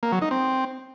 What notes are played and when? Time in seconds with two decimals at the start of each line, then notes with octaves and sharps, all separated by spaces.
0.03 A#3
0.12 F#3
0.22 D#4
0.31 C4